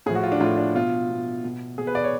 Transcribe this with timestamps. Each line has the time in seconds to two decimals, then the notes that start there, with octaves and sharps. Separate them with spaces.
0.06 A2 G#4
0.10 F3 F#4
0.23 F4
0.32 D4
0.40 A2 F3 F4
0.58 D4
0.75 B2 F4
1.10 B2
1.44 B2
1.78 B2 G#4
1.87 B4
1.95 D5
2.04 C#5